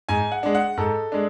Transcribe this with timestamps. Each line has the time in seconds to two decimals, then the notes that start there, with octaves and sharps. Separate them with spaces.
0.09 G#2 G#5
0.32 F#5
0.43 G#3 D4
0.55 F#5
0.77 G#2 A4
1.12 G#3 D4